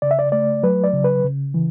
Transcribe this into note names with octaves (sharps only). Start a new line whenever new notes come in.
C#3 D5
E5
D5
A3 D5
F#3 B4
D5
C#3
B4
C#3
E3